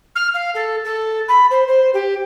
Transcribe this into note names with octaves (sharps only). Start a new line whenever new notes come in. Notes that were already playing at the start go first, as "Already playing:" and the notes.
F6
F5
A4
A4
B5
C5
C5
G4